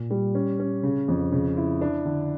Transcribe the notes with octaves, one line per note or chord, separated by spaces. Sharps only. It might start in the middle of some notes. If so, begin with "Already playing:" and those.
Already playing: A#2
G3
C#4
C#4
C#3
F2
C#3
E4
D4
D3